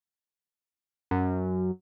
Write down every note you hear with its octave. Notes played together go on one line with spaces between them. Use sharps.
F#2